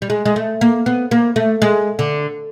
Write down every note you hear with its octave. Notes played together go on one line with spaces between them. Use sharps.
G3
G#3
G#3
A3
A#3
B3
A#3
A3
G#3
D3